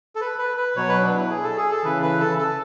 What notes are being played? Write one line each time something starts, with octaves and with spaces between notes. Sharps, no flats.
A4
B4
B4
B4
B2 F#3 C#5
B4
D4
E4
G#4
A4
G#4
A4
C#3 E3 B4
B4
A4
A4